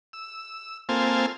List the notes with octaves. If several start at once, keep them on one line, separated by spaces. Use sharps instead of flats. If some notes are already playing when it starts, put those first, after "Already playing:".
E6
A#3 C4 F4 A4 C5 G#5